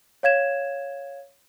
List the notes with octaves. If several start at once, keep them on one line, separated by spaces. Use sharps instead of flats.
C#5 F5 G#6 E7